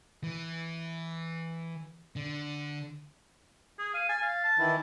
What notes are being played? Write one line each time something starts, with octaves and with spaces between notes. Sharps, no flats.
E3
D3
G#4 D#6
F5 D#7
G#5 A6
F5
A5
D#3 E3 E4